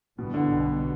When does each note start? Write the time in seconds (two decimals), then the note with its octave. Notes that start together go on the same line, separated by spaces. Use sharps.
0.17 G1 G2 B2 E3 B3
0.34 D3
0.49 B1 B2 G3 B3